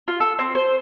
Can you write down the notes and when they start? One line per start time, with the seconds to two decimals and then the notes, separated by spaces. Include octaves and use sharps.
0.08 F4
0.20 A4
0.39 C4
0.55 C5